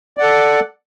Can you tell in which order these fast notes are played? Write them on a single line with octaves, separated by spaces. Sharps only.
D5 F#5 A4